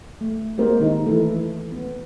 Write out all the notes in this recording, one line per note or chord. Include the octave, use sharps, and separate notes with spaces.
A3
G#3 A#3 C4 G4 A#4 C5
D#3 D#4
E3 A3 E4 A4
A4
B3